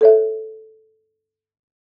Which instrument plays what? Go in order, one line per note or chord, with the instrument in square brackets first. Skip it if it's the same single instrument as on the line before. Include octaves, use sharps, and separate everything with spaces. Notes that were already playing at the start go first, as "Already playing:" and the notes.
[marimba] A4 C#5 E5